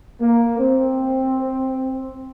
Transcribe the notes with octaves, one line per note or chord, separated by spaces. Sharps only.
A#3
C4